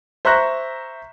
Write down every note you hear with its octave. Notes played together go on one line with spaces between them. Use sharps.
C5 E5 A#5 C#6 F#6 A#6